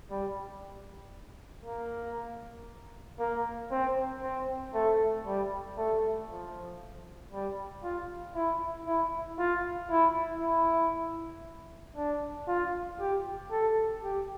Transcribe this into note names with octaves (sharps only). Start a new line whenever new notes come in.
G3
A#3
A#3
C4
C4
A3
G3
A3
F3
G3
F4
E4
E4
F4
E4
E4
D4
F4
G4
A4
G4